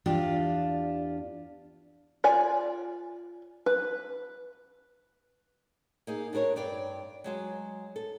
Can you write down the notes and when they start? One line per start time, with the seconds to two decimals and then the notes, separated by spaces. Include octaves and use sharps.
0.06 E2 D4 F4 G4
2.24 F4 D5 G#5
3.66 B4
6.07 A#3 D#4 G#4
6.33 D4 F#4 A#4 B4 C#5
6.56 G2 D5 G5
7.24 F#3 G#3 F#4
7.96 A4